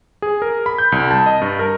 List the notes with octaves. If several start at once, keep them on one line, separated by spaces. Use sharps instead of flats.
G#4
A#4
B5
G6
C2
A5
D#5
G2
A#4